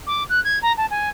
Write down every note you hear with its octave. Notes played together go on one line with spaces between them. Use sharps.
D6
F#6
G#6
A#5
A5
G#5